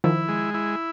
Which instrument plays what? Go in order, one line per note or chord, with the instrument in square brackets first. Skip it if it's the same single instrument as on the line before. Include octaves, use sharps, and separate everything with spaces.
[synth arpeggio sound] D#3 F3 [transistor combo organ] E4
[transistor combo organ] G#3
E4